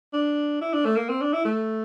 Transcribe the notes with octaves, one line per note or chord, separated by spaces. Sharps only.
D4
E4
D4
A3
A#3
C4
D4
E4
A3